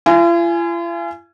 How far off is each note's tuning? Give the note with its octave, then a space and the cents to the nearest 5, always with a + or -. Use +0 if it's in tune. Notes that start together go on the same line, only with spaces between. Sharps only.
F4 -45 G#5 +0